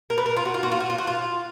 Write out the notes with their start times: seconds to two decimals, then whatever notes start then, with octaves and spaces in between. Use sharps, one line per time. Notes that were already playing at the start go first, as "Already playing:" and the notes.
0.10 A#4
0.18 B4
0.26 A#4
0.36 F4
0.45 F#4
0.54 F4
0.63 F#4
0.72 F4
0.80 F#4
0.90 F4
0.98 F#4
1.07 F4